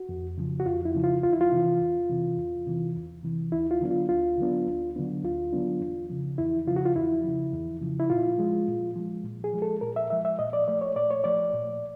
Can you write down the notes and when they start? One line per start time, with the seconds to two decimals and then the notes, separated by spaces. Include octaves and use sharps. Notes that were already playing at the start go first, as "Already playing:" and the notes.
Already playing: F#4
0.09 F2
0.38 C#3 F3
0.60 F#4
0.66 F2 F4
0.85 E4
0.94 C#3 F3
1.04 F4
1.23 E2 F4
1.33 E4
1.41 F4
1.52 C3 E3
1.81 E2
2.09 C3 E3
2.37 E2
2.67 C3 E3
2.95 E2
3.24 C3 E3
3.52 D2 E4
3.71 F4
3.81 D3 F#3 B3 D4
3.91 F4
4.09 D2 F4
4.38 D3 F#3 B3 D4
4.67 D2
4.96 D3 F#3 B3 D4
5.23 D2 F4
5.52 D3 F#3 B3 D4
5.81 E2
6.10 C#3 F3
6.38 E2 E4
6.67 C#3 F3 F4
6.76 F#4
6.86 F4
6.96 E2 E4
7.24 C#3 F3
7.53 E2
7.81 C#3 F3
8.00 E4
8.10 A#2 F4
8.38 F3 G#3
8.68 A#2
8.96 F3 G#3
9.24 A#2
9.44 G#4
9.53 F3 G#3
9.62 A4
9.81 A#2 A#4
9.96 E5
10.10 F3 G#3 E5
10.25 E5
10.39 A#2 D#5
10.53 D5
10.67 F3 A3 D5
10.81 C#5
10.96 A#2 D5
11.10 C#5
11.24 F3 A3 D5
11.53 A#2